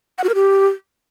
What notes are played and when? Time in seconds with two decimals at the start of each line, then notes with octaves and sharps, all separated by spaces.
0.18 F#5
0.24 F#4
0.29 A#4
0.35 G4